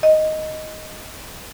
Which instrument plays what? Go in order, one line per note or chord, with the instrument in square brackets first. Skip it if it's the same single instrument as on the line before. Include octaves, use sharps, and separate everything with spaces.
[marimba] D#5